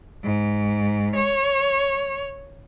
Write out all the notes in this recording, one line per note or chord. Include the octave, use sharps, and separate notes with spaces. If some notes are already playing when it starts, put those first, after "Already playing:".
G#2
C#5